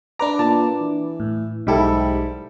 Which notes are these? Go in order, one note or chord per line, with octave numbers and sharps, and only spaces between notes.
D4 B4 A#5 D6
A#2 A5
E3
A2
B1 G#2 G3 E4 G4 A4